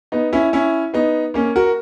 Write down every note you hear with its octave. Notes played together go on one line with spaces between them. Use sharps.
B3 D#4
C#4 E4
C#4 E4
B3 D#4
A#3 C#4
F#4 A#4